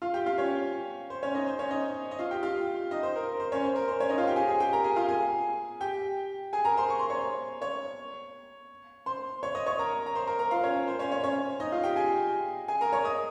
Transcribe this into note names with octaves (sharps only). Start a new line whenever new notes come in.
F4 F5
G4 G5
F4 F5
C#4 C#5
C5
C#4 C#5
D#4 D#5
C5
C#4 C#5
D#4 D#5
D#5
F4 F5
G4 G5
F4 F5
D#4 D#5
C5
A#4
A#4
C5
C#4 C#5
C5
A#4
C5
C#4 C#5
D#4 D#5
F4 F5
G4 G5
G#4 G#5
G#4 G#5
G4 G5
A#4 A#5
G#4 G#5
F4 F5
G#4 G#5
G4 G5
G#4 G#5
A#4 A#5
C5 C6
C#6
C6
C#5 C#6
C#5 C#6
C5 C6
C#5 C#6
D#5 D#6
C#5 C#6
A#4 A#5
A#5
C5 C6
A#4 A#5
A#4 A#5
F4 F5
C#4 C#5
A#4
C5
C#4 C#5
C#4 C#5
C#4 C#5
D#4 D#5
F4 F5
G4 G5
G#4 G#5
G#4 G#5
A#4 A#5
C#5 C#6
D#5 D#6